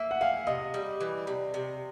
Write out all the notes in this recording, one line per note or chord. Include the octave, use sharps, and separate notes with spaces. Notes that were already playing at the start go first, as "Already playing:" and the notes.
Already playing: A#3 E5
F#5
G#4 F5
C3 D#5
G3
E3
C3
C3